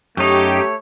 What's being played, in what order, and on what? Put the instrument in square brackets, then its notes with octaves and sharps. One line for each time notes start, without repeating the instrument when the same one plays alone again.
[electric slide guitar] F#2 D#4 [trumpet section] A3 C#5 C#6 [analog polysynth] G4